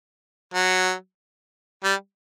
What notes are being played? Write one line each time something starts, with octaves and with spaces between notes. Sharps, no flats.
F#3
G3